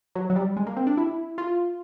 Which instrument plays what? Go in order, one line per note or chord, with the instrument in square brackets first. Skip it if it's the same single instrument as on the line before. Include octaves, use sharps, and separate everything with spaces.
[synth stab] F#3
F#3
G3
G#3
A#3
C4
D4
E4
F4